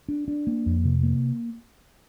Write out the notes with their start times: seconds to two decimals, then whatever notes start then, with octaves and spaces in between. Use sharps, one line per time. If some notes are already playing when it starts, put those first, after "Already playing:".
0.09 D4
0.28 D4
0.47 A#3
0.66 F2
0.85 C3
1.03 A#3